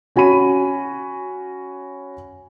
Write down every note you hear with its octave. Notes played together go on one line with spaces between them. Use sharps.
C#4 F#4 G#5 B5 D#7